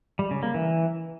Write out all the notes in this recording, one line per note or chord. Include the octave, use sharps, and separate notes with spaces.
G3
C#3
A#3
E3